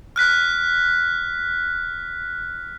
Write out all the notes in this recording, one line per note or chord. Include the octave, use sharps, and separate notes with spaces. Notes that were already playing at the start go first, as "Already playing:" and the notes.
F6 F#6 B6